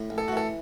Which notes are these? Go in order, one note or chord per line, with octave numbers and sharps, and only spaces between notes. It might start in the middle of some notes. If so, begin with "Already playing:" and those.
Already playing: A2
A1
A4
F#4
E3 A4